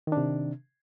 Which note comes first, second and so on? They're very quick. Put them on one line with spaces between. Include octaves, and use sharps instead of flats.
D#3 D4 C3